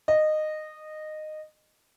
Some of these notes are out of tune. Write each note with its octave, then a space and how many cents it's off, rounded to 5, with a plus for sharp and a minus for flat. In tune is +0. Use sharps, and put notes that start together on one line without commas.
D#5 -15